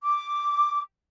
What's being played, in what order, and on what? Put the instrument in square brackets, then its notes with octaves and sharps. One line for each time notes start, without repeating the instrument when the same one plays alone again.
[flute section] D6